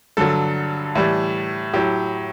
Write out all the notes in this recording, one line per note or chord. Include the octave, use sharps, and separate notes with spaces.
G2 D3 F#3 A4
A2 E3 G3
A2 F#3 G4